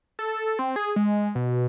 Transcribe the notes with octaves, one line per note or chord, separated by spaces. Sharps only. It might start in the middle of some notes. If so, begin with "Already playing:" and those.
A4
C4
G#4
G#3
B2